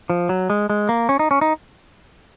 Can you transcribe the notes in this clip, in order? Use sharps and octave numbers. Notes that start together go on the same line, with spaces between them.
F3
F#3
G#3
G#3
A#3
C#4
D#4
C#4
D#4